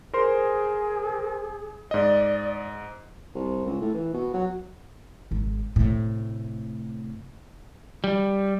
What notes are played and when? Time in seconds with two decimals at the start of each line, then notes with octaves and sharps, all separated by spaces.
0.14 G#4 A#4 C5 C6
1.91 G#2 D5 D#5
3.35 C2
3.66 C#2
3.81 A2
3.94 E3
4.13 B2
4.34 F#3
5.31 G#1 G#3
5.76 A2 C3
8.04 G3